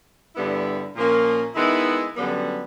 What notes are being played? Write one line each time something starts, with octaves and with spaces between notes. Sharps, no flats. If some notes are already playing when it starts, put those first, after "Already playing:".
G2 D3 G3 B3 E4
A#2 F3 A#3 C#4
D#3 G#3 B3 E4
F#2 D3 G3 B3